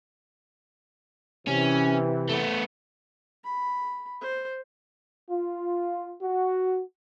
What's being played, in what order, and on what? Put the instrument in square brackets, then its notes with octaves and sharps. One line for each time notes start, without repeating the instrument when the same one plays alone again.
[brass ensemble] C3 E3 [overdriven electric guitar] C#4
[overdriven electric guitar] A3 B3
[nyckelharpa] B5
C5
[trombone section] F4
F#4